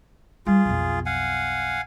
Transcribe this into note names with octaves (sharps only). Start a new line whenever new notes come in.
G3 F4 G#4
B1 F2
F5 F#5 G#5